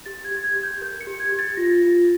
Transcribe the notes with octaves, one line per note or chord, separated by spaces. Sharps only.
G4 A6
G#6
G4
G#6
G4
G6
A#4 G6
C#7
G4
G#6
G4
A6
F4 A#6
F4